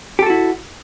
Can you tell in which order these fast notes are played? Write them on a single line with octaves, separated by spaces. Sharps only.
G4 A4 F#4 E4